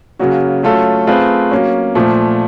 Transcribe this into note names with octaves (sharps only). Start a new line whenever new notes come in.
C#3 F#3 A#3 C#4 F#4
F#3 A3 C#4 F4 A4
A3 C4 F4 G#4 B4
F#3 A#3 C#4
A#2 F3 A3